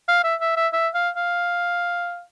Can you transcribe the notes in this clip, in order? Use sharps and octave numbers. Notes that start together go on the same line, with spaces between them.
F5
E5
E5
E5
E5
F5
F5